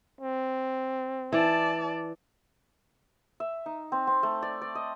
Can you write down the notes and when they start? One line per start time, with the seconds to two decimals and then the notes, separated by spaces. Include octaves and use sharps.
0.21 C4
1.33 E3 D5 A5
3.40 E5
3.66 D#4
3.92 C4
4.07 C4
4.23 A3
4.42 D5
4.62 D5
4.75 D#5